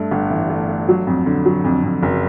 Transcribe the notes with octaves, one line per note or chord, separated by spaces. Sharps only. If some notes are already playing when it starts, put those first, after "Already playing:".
Already playing: G2 A3
G1
E3
A3
A3
F#3
F2
D3
F#3
F2
F2
F#1